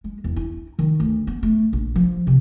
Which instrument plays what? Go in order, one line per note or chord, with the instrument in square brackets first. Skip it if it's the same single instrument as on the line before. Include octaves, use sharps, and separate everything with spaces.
[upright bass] G#3
E2
E4
D#3
D2
B3
A3
A#1
F3
C3